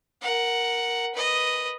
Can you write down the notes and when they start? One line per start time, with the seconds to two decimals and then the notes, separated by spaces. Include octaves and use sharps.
0.22 A#4 F#5
1.15 B4 D#5